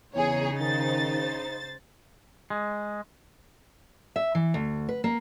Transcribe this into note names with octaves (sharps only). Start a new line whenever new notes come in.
E2 C#3 D#4 G#4 C#5
D#3 C5 A6
G#3
E5
E3
D2
B4
A#3